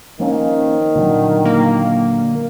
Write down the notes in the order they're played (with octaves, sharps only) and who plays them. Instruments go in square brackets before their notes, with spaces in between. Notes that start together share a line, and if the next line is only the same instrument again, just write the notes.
[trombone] D#3 [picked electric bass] F3 A#3 C#4
[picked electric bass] A#2 D3 F#3
[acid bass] A#3